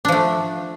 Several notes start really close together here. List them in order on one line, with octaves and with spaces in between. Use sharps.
D4 F3 A3